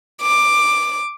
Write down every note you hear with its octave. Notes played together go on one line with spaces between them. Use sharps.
D6